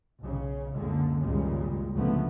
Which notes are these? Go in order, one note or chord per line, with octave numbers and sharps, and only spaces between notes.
B1 C#3
C#2 F#2 D3 G#3 A#3
G#1 C#2 A#2 C#3 G3 G#3
C#2 A#2 D3 F3 A3 B3